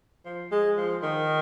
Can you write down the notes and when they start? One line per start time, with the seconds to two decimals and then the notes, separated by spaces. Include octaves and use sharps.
0.25 F3
0.52 G#3
0.77 F3
1.03 D#3